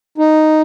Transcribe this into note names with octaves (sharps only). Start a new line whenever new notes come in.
D#4